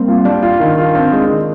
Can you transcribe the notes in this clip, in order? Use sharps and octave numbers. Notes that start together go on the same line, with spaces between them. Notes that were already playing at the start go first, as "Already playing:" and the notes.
Already playing: G3 A#3 C4
F4
G3 D4
F4
D#3
F4
C4 D4
G#3
D#3